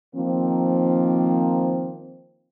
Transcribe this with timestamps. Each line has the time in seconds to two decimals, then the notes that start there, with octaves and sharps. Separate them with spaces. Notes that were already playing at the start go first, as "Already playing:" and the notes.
0.15 D#3 F3 A#3 C4